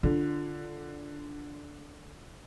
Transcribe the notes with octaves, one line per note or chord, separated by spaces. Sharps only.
D3 F4